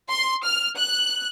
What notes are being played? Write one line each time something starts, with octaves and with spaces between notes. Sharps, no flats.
C6
F6
F#6